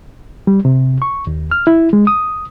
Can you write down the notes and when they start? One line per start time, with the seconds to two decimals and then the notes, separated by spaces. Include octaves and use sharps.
0.47 G3
0.65 C3
1.02 C#6
1.27 D#2
1.51 F6
1.67 E4
1.93 G#3
2.07 D#6